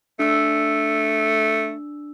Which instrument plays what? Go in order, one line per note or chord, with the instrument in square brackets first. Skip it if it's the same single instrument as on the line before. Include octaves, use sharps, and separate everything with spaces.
[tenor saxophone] A3 [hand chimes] D4 E6